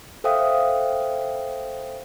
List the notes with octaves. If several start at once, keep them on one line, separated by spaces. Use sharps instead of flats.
A4 C5 E5 F5 G5 D#6